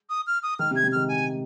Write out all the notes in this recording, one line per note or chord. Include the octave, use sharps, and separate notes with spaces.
D#6
F6
D#6
D#3 F6
C3
G#6
C3
D#3 F6
G#5